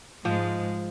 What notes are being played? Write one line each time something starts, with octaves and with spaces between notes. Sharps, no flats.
G#2 F3 G#3